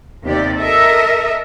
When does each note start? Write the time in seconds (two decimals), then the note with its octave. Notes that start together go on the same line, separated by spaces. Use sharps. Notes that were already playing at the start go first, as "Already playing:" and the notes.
0.23 D#2 C3 G4 D5
0.59 A4 A#4 D#5 E5